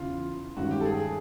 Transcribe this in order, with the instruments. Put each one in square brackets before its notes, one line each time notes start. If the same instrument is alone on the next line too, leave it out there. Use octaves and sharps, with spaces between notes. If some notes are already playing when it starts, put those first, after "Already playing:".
Already playing: [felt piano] E2 C#3 E3 [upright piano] F4
[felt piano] G2 D#3 G#3 C#4 [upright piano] F#4
[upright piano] G4
A4
G#4
G#4